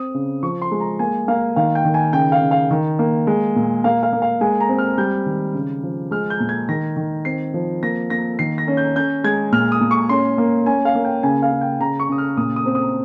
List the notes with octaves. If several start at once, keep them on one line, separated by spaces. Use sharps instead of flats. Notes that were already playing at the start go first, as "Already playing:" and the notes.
Already playing: C4 D#6
C#3
F3 C#6
C6
G#3
A#5
A#3 G#5
A#3 F5
D#3 F5
G5
D#3
G#5
C#3 G5
F5
C#3
F5
D#3
A#3
G#3
A#2
A#3 F5
F5
A#3
F5
G#3 G#5
A#5
C4
F6
G3 G6
D#3
C#3
F3
G#3 F6
G6
A#2
G#6
D#3 A#6
D#3
C4 C7
F3
A#3 A#6
A#3 A#6
D#3 C7
A#6
C#4
G6
C#4 G6
G#3 G#6
A#2 F6
D#6
A#2
C#6
C#4 C6
A#3
C#4 G#5
F5
A#3
G5
C#3 G#5
F5
C#3
G5
C#3 A#5
C#6
C#3 D#6
F6
A#2 D#6
D#6
C4
D#6